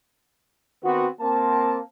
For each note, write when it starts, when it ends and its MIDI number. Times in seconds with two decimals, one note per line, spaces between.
0.84 1.07 51
0.84 1.07 59
0.84 1.07 60
0.84 1.07 66
1.20 1.79 58
1.20 1.79 60
1.20 1.79 81